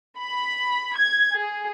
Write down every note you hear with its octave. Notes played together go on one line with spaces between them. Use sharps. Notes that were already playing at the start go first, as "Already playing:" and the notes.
B5
G#6
G#4